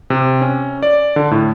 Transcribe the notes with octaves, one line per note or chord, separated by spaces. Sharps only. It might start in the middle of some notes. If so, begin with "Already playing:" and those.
C3
C#4
D5
D3
A2